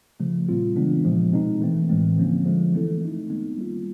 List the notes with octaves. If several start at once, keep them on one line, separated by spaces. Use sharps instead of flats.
C#3 F3 A3
A#2 G3 C4 F4
C#3 E3 G#3 B3 D4
A#2 F3 G#3
B2 G#3 C4 D#4
E3 A3 C4
A2 E3 G#3 C4
D3 F3 A#3 C#4
D3 F3 G#3
E3 A3 C4 E4 A4
A3 C4 D#4
D#3 G#3 B3 D#4
G3 A#3 C#4 F4